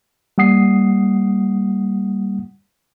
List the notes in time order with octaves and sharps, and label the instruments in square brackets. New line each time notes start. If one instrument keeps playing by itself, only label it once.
[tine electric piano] G3 A#3 F#5 D#6 C7